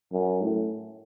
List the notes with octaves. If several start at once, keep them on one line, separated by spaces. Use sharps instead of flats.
F#2
A2